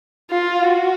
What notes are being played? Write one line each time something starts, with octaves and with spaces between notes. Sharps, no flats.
F4
F#4